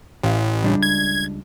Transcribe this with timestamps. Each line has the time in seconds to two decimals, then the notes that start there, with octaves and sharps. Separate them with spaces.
0.23 A1 E4 F5
0.63 C#2 G3 D4
0.83 G#6